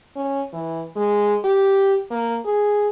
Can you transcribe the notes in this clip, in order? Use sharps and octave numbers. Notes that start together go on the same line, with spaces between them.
C#4
E3
G#3
G4
A#3
G#4